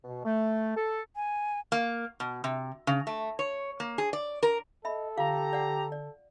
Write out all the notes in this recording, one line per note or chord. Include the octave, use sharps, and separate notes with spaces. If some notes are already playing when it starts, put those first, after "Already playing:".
B2
A3
A4
G#5
A#3
B2
C3
C#3
A3
C#5
A#3
G#4
D5
A#4
A4 D#5 E5 B5
D3 F4 G4 F5 A#5 D6
D5 F#5
D5